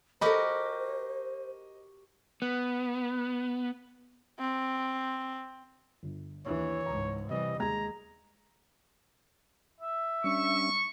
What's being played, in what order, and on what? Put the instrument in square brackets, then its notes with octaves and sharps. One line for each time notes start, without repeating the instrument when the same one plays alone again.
[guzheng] F#4 G4 A#4 [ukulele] A4 B5 [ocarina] C5 [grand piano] D#5
[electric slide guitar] B3
[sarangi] C4
[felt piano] G1
[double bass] D#2 E3 [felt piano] D4 E4 [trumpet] C#5
[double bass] C#2 G#2 [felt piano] A#5
[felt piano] C3 [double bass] E3 G3 [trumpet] D#5
[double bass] D#2 [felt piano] G#3 G#6 [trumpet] A#5
[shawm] E5
[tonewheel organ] G3 C#4 D4 [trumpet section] C#6